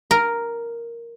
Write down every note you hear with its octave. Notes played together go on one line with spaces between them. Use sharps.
A#4